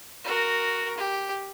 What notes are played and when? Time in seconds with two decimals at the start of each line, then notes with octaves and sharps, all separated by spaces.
0.24 F#4 A#4
0.97 G4